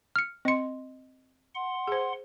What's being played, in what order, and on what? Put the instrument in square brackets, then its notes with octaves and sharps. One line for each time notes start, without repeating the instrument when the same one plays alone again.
[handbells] F6 C#7
[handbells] C4 C#7 [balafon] D#5 C6
[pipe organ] F#5 C6
[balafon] G#4 C5